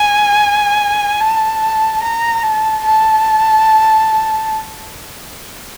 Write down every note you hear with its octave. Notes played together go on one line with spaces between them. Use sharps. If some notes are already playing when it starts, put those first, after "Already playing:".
Already playing: G#5
A5
A#5
A5
A5